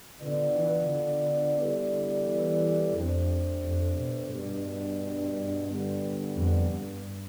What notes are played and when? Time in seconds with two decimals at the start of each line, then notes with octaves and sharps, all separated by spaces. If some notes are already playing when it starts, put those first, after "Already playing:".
0.21 D3 B3 D4 F4 B4 D5
0.56 E3
0.89 D3
1.58 G3 B3 E4 A4 D5
2.26 E3
2.94 F2 A3 D4 G4 C5
3.63 F2
3.97 B2
4.31 G2 B2 G3 B3 D4
5.67 D3 G3 B3
6.35 F2
6.70 G2